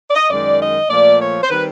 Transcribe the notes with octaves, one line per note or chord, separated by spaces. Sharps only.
D5
D#5
F#2 D#3 G#3 D5
D#5
A#2 F3 A3 D5
C#5
C5
D#3 G3 C4 B4